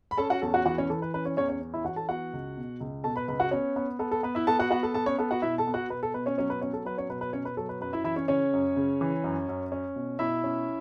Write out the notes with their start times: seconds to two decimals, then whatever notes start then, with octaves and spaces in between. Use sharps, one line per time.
0.11 B5
0.18 C#4 A4 A5
0.30 F#4 F#5
0.42 E2 A4 A5
0.54 F#4 F#5
0.66 E3 F#4 F#5
0.78 C#4 C#5
0.90 E3 A4
1.02 B4
1.14 C#4 B4
1.25 C#4 C#5
1.37 E2 C#4 C#5
1.49 C#4 C#5
1.61 C#4
1.74 E4 E5
1.84 E3 F#4 F#5
1.96 A4 A5
2.09 B3 F#4 F#5
2.33 C#2
2.57 B2
2.81 C#2
3.04 B2 A4 A5
3.16 B4 B5
3.28 C#2 B4 B5
3.40 F#4 F#5
3.51 B3 C#4 C#5
3.76 B3
3.99 B3 A4
4.11 A4
4.23 B3 B4
4.35 E4 E5
4.47 B3 A4 A5
4.59 F#4 F#5
4.71 B3 F#4 F#5
4.83 A4 A5
4.94 B3 A4 A5
5.06 C#4 C#5
5.19 B3 A4
5.31 F#4 F#5
5.42 B2 E4 E5
5.58 A4 A5
5.67 B3
5.74 F#4 F#5
5.90 B2 B4
6.03 A4
6.14 B2 B4
6.26 C#4 C#5
6.38 F#3 C#4 C#5
6.50 B4
6.61 B3 C#4 C#5
6.73 A4
6.85 F#3 B4
6.98 C#4 C#5
7.09 B2 B4
7.21 B4
7.33 B2 C#4 C#5
7.45 B4
7.57 F#3 A4
7.69 B4
7.81 F#2 B4
7.93 E4 E5
8.04 E3 E4 E5
8.16 C#4 C#5
8.28 C#3 C#4 C#5
8.53 F#2
8.76 C#3
9.01 E3
9.24 F#2
9.49 F#2
9.72 C#4
9.96 B2
10.19 B2 E4 E5
10.44 C#4